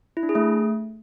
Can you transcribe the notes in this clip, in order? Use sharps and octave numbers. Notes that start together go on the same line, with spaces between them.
E4
D4
G#4
A3